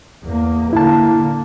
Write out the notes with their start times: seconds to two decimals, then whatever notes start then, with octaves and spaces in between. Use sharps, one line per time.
0.23 E2 A#3
0.73 D3 A#3 E4 A5